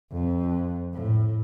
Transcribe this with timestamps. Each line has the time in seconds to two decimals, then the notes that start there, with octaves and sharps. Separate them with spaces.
0.12 F2
0.94 A2